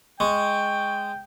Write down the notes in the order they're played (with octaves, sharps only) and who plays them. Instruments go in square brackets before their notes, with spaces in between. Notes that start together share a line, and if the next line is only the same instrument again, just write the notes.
[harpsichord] G#3 [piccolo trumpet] G5 [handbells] C#6